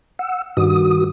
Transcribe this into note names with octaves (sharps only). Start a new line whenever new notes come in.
F#5 E6
G2 D#3 F#4 D#6